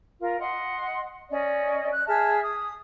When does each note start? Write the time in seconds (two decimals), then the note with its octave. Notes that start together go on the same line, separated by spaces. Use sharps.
0.19 F4 A#4
0.39 D#5 F#5 C6
1.30 C#4 D5 D#5
1.91 F#6
2.07 G#4 E5 A5 F6
2.42 D#6